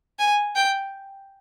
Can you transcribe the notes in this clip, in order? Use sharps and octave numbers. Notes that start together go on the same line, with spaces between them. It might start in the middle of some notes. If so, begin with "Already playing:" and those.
G#5
G5